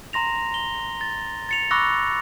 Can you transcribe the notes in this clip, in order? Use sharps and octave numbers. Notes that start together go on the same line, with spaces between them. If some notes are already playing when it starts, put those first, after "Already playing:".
A#5 C6 A#6 F7
G7
A6
A6 C#7 F7
B5 C#6 D6 E6 F#6 A#6